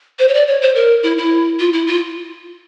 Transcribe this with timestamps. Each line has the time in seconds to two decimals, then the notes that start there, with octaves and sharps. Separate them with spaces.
0.19 C5
0.28 C#5
0.34 D5
0.48 C#5
0.62 C5
0.75 A#4
1.03 E4
1.18 E4
1.60 F4
1.73 E4
1.87 F4